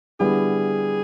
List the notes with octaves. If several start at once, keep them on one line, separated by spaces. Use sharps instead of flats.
D3 G3 B3 E4 G#4